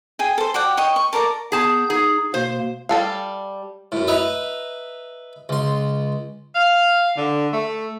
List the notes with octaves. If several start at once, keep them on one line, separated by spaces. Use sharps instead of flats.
G#4 G5 G#5
A4 C5
F#4 D5 F#5 G5
C#5 D#5 G5 C#6
C#6
A4 A#4 D5 A#5
B3 G#4 A5 G6
D#4 G#4
B2 A#3 C5
G3 A4 F5
F#2 A2
B4 D#5 E5 A#5
C#2 C6
F5
D3
A3